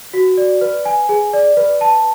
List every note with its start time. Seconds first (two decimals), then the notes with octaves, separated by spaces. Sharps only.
0.13 F#4
0.38 D5
0.61 B4
0.85 G#5
1.09 G#4
1.33 D5
1.57 B4
1.81 A5